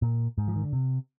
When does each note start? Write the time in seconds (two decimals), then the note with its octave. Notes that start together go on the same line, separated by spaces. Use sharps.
0.02 A#2
0.38 G#2
0.48 F3
0.56 D#3
0.64 D3
0.73 C3